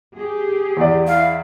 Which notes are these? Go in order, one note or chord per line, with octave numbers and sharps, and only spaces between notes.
G4 G#4
E2 D5
E4 F5